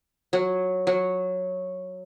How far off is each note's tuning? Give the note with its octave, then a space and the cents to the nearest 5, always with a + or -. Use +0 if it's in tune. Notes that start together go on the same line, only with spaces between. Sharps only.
F#3 -10
F#3 -10